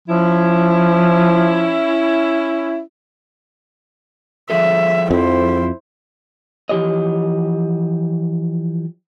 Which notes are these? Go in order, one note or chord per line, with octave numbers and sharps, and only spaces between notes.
F3 C#4 E4
F3 G#4 A4 E5
F2 E4 C5
E3 F3 G4 C#5 D#5